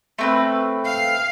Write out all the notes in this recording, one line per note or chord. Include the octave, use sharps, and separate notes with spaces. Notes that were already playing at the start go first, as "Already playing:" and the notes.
A3 C4 B4
F5